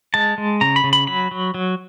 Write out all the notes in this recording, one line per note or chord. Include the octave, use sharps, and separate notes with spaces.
G#3 A5
G#3
C#3 A#5
B5
C#3
B5
F#3 B5
F#3
F#3